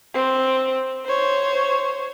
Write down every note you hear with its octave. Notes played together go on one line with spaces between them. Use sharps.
C4
C5 C#5